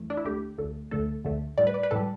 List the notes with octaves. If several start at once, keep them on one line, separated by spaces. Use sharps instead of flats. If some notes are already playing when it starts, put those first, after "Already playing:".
Already playing: E2 E3 A3
D4
E4
D2 D3 A3 G4
D2 D3 A3
D2 D3 A3 A4
D2 D3 A3
A2 G3 D5
B4
D5
B4
A2 G3 A4